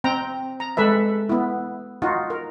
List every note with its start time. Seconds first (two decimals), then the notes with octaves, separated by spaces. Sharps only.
0.04 C4 G5 A#5
0.60 A#5
0.77 G#3 A4 B4 E5
1.29 B3 E4
2.02 D#4 F4 F#4
2.30 A#4